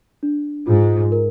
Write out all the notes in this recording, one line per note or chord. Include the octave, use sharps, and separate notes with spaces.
D4
G#2 F4
A#4